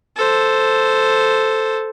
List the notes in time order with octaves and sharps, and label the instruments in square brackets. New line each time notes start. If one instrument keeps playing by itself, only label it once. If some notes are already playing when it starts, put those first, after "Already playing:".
[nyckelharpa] A4 C5